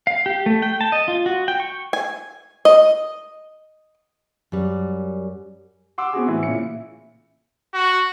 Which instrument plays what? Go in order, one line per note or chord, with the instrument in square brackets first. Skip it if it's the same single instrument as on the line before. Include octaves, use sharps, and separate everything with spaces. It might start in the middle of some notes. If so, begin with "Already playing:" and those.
[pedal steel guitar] F5
G4
A3
G5
A5
D#5
F4
F#4
G5
C#6
[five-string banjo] G#5
D#5
[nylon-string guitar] F#2 G3
[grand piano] F#5 C6 D6 E6
B3 C4 F#4 G#4
A2 E3 E4
A#2 C#3 E4 C#7
[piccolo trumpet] F#4